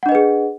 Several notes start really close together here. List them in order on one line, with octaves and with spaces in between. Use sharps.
F#5 D4 D#5 B4 G#4